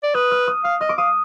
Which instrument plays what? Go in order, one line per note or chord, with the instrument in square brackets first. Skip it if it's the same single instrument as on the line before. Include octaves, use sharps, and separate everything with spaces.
[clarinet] D5
[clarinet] B4 [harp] D#6
[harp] F6
D#6
[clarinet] F5 [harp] F6
[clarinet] D#5 [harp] F6
[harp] D6
[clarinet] F5 [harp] D#6